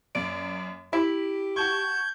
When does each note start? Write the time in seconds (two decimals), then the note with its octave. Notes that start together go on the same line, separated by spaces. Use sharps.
0.15 F#2 A#3 D5 D7
0.93 E4 G4 B6
1.56 F#4 A5 C#6 G6 G#6